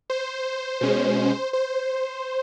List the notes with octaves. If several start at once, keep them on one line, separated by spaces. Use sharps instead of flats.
C5
B2 G#3 C#4
C5